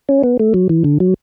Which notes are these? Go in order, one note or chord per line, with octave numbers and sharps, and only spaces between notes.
C#4
B3
A3
F#3
E3
D3
F#3